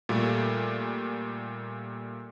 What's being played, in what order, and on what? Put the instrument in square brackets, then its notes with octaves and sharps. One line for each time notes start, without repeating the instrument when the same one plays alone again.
[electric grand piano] A#2 G3 A3